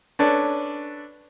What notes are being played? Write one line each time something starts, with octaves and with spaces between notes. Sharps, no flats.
C#4 D4 A4 B4 C#5 D5